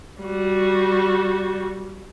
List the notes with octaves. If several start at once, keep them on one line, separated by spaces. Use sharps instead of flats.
G3 F#4